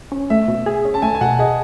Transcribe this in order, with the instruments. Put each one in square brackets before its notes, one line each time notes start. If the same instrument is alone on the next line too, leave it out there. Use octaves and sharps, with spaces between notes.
[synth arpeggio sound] C#4
[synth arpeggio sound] A3 [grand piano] E5
[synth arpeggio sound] B2
G#4
C#4
[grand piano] A5
[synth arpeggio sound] A3 [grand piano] G#5
[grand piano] G#5
[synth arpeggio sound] B2 [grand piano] F#5
[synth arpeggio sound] G#4 [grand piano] D#5